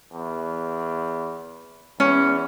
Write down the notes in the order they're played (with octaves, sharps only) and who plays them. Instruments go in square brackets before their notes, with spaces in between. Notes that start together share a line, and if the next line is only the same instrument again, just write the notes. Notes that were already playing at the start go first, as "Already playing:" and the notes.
[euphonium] E2
[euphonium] E2 [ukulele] C#4